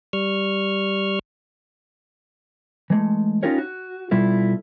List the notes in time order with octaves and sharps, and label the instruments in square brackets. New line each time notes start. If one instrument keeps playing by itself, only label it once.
[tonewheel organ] G3 C#6 F6
[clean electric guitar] E3 G#3 A3
C#4 D#4 F4 G4 A#4 C#5
F#4
B2 G3 E4 F4 A4